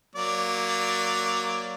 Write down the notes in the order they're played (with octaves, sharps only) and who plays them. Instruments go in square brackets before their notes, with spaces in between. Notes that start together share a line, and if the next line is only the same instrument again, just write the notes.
[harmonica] F#3 A#3 D5